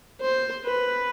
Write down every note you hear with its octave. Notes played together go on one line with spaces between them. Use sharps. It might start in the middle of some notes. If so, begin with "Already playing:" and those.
C5
B4